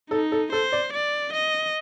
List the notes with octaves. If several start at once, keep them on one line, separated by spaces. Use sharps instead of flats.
D#4 A4
A4
A4 C5
D5
D5
D#5